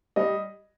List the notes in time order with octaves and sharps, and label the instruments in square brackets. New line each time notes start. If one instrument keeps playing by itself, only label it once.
[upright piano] G3 D#5